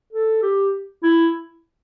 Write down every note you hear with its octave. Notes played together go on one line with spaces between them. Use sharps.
A4
G4
E4